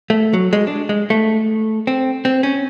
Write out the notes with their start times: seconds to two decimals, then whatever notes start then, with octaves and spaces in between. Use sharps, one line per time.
0.10 A3
0.33 F#3
0.53 G#3
0.67 D4
0.89 G#3
1.10 A3
1.87 C4
2.25 C4
2.43 C#4